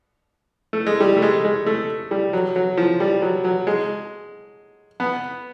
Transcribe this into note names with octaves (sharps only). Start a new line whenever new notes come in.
A3
G#3
G3
A3
G#3
G#3
A3
G3
F#3
F#3
F3
G3
F#3
F#3
G#3
B3